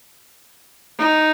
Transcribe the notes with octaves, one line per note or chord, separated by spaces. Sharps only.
D#4